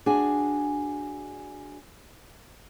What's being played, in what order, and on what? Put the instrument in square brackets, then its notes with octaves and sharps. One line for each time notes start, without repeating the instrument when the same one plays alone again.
[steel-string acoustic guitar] D4 F#4 G#4 G#5